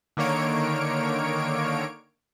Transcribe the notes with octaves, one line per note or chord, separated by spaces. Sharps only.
D3 D#3 A#3 C#5 D7